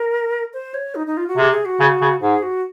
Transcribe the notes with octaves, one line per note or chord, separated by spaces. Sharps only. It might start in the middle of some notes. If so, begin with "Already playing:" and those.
Already playing: A#4
C5
C#5
D#4
D#4
F4
F#4
C3 G#4
G#4
F#4
C#3
C#3
G#2 G#4
F#4